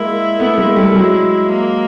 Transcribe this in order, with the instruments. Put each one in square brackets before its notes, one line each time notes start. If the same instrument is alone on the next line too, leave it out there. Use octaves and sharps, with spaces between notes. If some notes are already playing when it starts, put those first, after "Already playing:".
Already playing: [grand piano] G#3 A#3 [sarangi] E4
[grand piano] A3 B3
G#3 A#3
G3 A3
F#3 G#3
[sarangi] A#3